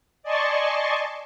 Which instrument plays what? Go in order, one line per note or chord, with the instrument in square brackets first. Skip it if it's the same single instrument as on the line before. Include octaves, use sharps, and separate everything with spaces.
[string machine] D5 D#5 G#5 A5 C6 C#6